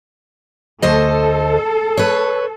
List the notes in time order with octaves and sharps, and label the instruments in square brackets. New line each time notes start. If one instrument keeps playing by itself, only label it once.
[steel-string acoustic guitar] D2 C5 D#5 [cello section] A4
[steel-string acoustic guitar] B4 C#5